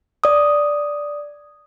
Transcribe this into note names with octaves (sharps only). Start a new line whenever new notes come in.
D5 D#6